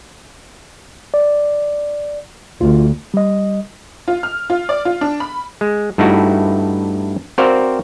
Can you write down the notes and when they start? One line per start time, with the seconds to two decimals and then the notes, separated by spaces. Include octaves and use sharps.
1.14 D5
2.61 D2 F4
3.14 G3 D#5
4.08 F4
4.23 F6
4.50 F4
4.69 D5
4.85 F4
5.01 D4
5.20 B5
5.61 G#3
5.98 G2 A3 D#4 E4 F#4
7.38 C4 F#4 A#4 C5 D5 F5